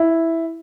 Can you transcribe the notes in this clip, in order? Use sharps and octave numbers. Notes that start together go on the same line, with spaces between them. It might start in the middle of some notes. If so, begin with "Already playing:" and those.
Already playing: E4